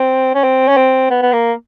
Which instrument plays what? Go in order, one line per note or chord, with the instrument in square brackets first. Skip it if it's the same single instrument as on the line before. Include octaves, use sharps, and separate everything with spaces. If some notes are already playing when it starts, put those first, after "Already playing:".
Already playing: [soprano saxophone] C4
C#4
C4
C#4
C4
B3
B3
A#3